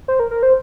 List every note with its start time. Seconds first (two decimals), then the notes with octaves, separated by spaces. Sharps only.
0.08 C5
0.20 A#4
0.31 A#4
0.43 C5